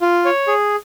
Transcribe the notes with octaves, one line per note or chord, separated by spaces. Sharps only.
F4
C#5
G#4